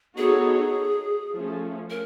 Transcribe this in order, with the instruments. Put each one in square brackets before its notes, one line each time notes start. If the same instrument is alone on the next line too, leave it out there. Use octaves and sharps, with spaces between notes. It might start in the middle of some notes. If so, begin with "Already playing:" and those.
[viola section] B3 D#4 F#4 A4 C#5 [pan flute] G#4
[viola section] F3 A3 C#4
[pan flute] A#4